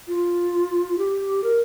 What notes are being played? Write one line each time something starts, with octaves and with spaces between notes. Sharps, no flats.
F4
G4
A#4